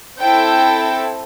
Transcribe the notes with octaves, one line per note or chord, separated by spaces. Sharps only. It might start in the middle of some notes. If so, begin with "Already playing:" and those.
C4 E4 A4 G5